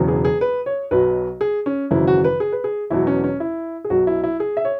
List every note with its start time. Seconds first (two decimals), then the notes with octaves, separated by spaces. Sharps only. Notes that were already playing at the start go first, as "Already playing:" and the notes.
Already playing: E1 E2 C#3 F#3
0.08 G#4
0.25 G#4
0.41 B4
0.66 C#5
0.91 B1 B2 F#3 B4
1.41 G#4
1.66 C#4
1.91 G#1 F#2 C#3 E3 E4
2.07 F#4
2.24 B4
2.40 G#4
2.52 B4
2.64 G#4
2.90 E1 E2 B2 F#3 E4
3.07 C#4
3.24 C#4
3.40 E4
3.85 G#4
3.90 B1 B2 F#3 F#4
4.07 E4
4.24 E4
4.40 G#4
4.57 E5
4.65 C#5